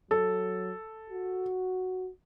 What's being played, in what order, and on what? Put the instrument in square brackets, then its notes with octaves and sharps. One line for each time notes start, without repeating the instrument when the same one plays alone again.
[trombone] F#3 [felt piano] A4
[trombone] F#4